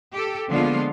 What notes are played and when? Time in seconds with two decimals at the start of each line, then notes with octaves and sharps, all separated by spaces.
0.14 G4 A4
0.50 D3 F3 G#3 A#3 B3 F4